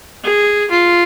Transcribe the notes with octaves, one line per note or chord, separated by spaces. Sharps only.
G#4
F4